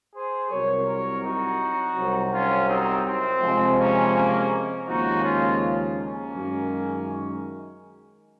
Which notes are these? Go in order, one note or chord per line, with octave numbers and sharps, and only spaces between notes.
G#4 C5
C2 C3 F#3 A#4 C#5
A#4 C#5
D#4 F#4
C2 C3 F#3
C#4 F4
C4 D#4
C4
F2 C3 F3 G#3
A#3 C#4
A#3 C#4
D#2 C#3 F3 G#3 D#4 F#4
C#4 F4
A#3 C#4
F#2 D#3 G#3